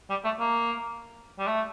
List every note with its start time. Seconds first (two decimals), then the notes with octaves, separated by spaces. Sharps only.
0.10 G3
0.24 A3
0.40 A#3
1.39 G3
1.47 A3